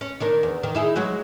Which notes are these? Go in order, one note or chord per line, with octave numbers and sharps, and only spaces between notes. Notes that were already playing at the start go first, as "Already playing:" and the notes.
C#4
D#3 D4 A#4
E2
D#3
D#4 E4 G#4
F#3 G#3 F#4